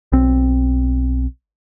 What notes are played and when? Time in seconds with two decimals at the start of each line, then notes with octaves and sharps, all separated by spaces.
0.12 B1 C4